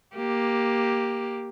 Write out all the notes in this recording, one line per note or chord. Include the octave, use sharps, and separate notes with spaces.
A#3 G4